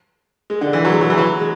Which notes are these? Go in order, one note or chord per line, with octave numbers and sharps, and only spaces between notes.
G#3
D3
E3
F#3
G#3
F#3
E3
F#3
G#3